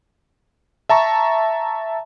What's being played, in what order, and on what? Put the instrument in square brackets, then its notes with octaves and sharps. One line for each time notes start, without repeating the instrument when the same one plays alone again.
[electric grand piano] E5 A5 A#5 C#6